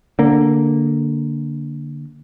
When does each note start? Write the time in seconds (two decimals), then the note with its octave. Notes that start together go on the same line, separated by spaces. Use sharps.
0.19 D3 A#3